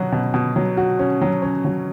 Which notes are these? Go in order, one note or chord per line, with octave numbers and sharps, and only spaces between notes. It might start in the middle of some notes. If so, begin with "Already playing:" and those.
Already playing: B2 F#3 F#4
B2
B2
F#3
F#4
C#4
F#3
C#4
F#3